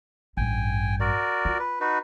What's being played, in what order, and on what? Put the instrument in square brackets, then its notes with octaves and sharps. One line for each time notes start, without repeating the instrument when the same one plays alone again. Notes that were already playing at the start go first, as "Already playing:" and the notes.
[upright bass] A1 G2 [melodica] G5 G#5
[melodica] F#4 A#4 D5
[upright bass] F4
[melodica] B4
D#4 F#4 B4